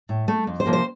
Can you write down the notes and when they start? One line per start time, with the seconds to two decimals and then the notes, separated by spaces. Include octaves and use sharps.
0.09 A2
0.28 A3
0.47 F2
0.60 C5
0.66 C3 F3 A#3
0.73 C5